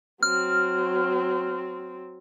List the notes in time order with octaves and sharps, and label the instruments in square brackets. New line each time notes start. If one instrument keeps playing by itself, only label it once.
[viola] F#3 C4 [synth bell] F6